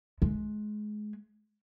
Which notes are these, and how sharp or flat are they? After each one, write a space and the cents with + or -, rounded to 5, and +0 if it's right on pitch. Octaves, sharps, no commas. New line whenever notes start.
G#3 +25